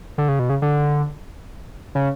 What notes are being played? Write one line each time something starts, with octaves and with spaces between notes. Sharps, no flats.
D3
C#3
B2
C#3
D3
C#3